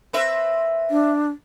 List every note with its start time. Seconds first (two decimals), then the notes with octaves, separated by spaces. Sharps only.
0.13 C4 B4 E5
0.90 D4